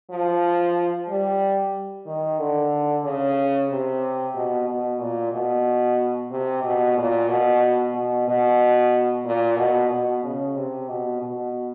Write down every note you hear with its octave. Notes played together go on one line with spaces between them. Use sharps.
F3
G3
D#3
D3
C#3
C3
B2
B2
A#2
B2
C3
B2
A#2
B2
B2
B2
A#2
B2
B2
C#3
C3
B2
B2